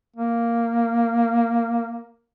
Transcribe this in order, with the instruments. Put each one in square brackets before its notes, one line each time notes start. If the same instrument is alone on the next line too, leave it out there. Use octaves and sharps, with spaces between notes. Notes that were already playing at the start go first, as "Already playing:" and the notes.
[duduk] A#3